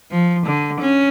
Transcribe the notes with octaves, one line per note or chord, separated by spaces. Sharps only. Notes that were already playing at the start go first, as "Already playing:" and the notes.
F3
D3
C#4